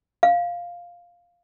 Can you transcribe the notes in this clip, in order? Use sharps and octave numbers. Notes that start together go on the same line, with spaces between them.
F5